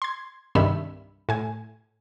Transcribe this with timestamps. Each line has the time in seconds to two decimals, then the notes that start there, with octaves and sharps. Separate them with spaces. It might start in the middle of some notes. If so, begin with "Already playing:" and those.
0.02 C6 G#6
0.55 C2 G2 D#3 E5 B5 E6
1.29 A2 G#5